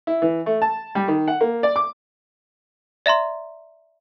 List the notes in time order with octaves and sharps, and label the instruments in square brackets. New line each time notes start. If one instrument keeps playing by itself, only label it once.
[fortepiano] E4
E3
A3
A5
G3
D#3
F#5
A#3
D5
D6
[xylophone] D5 E5 A#5 C6